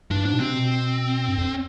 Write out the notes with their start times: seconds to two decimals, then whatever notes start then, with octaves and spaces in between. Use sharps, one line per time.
0.10 G2 D4
0.25 G#2 D4
0.33 B2
0.40 C3 C4
0.54 B2
1.28 G2
1.38 F2